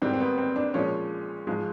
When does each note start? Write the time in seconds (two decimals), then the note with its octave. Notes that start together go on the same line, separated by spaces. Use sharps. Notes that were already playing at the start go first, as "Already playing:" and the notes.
0.02 G#2 D#3 G3 C4
0.13 C4
0.20 B3
0.38 C4
0.56 D4
0.74 A#2 F3 G#3 C#4
1.47 G#2 F3 G#3